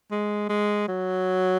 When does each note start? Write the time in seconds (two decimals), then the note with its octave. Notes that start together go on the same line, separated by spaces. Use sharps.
0.11 G#3
0.49 G#3
0.88 F#3